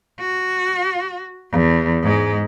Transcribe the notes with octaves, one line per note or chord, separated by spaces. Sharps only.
F#4
E2
G#2 G#3